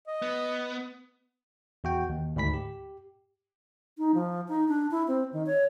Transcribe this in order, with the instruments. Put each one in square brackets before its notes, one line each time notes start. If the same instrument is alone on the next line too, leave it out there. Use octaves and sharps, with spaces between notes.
[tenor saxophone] D#5
[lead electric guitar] B3
[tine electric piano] E2 F#4 G5
D#2
D2 G#2 B5 B6
G4
[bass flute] D#4
F3
D#4
D4
E4
C4
D#3
C#5